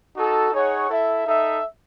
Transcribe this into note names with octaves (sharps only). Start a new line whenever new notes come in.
D#4 F#4 A4
D#4 G#4 C#5 F#5
E4 A4 E5
D#4 A4 E5